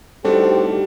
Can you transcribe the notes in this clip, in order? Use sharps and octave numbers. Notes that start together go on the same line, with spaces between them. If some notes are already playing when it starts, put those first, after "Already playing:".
A2 G3 C4 D4 D#4 F#4 G4 A4